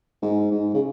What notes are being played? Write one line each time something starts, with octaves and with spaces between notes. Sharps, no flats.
G#2
G#2
C#3